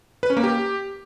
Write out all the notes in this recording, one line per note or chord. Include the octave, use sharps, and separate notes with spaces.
B4
C#4
A#3
G4